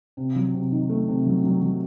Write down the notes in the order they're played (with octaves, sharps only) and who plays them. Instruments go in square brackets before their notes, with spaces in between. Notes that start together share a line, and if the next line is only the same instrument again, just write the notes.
[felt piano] C3
F#3
C3
D#3
A3
C3
F#3
F#3
F#3